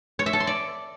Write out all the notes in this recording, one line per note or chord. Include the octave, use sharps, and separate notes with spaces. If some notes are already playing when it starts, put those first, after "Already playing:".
C#5
E5
A4
C6
D5